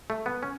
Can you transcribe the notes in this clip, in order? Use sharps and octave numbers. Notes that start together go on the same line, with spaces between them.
A3
B3
C#4